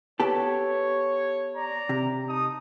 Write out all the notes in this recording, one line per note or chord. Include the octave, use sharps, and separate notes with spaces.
B3 G4 A4 C#5
D5 A#5
C3
D#4 A5 D#6